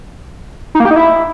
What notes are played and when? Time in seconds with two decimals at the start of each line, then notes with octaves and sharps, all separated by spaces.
0.75 D#4
0.80 A#3
0.85 G4
0.91 D#4
0.96 E4